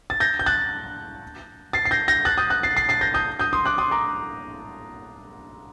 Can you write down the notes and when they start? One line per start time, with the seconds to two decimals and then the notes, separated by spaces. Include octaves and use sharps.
0.10 A6
0.20 G6 A#6
0.39 G6
0.46 F#6 A6
1.73 A6 C7
1.85 C7
1.91 G6 A#6
2.08 G6 A#6
2.25 F#6 A6
2.38 D#6 G6
2.50 F#6 A6
2.63 A6 C7
2.77 A6 C7
2.89 A6 C7
3.01 G6 A#6
3.14 D#6 G6
3.39 D#6 G6
3.53 C6 D#6
3.65 D6 F#6
3.78 C6 D#6
3.91 A#5 D6